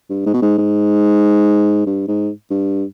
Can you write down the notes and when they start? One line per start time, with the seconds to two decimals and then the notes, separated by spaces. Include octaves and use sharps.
0.10 G2
0.26 G#2
0.33 B2
0.42 G#2
0.58 G#2
1.86 G2
2.08 G#2
2.50 G2